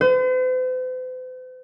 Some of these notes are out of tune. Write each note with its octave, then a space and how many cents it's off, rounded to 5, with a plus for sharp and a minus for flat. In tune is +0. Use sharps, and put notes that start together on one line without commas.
C5 -45